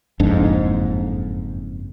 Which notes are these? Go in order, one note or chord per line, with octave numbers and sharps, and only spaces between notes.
F#1 F2 G#2 D4